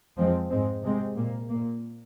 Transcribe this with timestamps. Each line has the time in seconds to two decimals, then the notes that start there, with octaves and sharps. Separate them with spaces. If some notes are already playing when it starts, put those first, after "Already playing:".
0.17 F2 F3 G#3 C4
0.50 G#2 G#3 C4
0.82 C3 G#3 C4
1.16 A#2 A#3
1.49 A#2 A#3